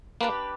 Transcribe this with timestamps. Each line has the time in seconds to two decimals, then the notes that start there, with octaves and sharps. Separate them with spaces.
0.21 A#3 D4 G4 B4